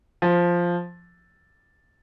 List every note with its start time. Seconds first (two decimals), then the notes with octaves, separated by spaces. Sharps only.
0.22 F3